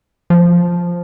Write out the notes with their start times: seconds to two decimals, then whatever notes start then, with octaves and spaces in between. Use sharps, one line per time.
0.30 F3